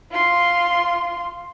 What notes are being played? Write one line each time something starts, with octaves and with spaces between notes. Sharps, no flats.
F4 C6